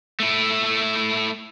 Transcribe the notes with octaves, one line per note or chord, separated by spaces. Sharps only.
A3 E4